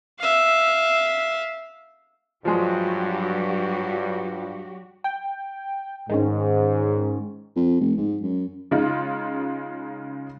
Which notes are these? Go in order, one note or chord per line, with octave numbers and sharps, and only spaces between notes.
E5 F5
G2 F3 F#3 G#3 F#4 G4
G5
G#2 D#3 G#3 C#4
F2
F1
G#2
F#2
C#3 G#3 D#4 F4